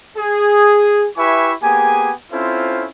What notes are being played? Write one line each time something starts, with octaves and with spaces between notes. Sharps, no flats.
G#4
E4 G4 B4 E5 G#5 C#6
A#3 B3 G4 G#4 G#5
C4 C#4 E4 F4 A4 C5